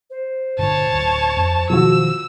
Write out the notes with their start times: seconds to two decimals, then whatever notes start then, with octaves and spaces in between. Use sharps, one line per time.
0.10 C5
0.59 G2 A#2 D3 C#5 A5
0.92 D1
1.37 F2
1.70 B2 D#3 F3 F#4 E6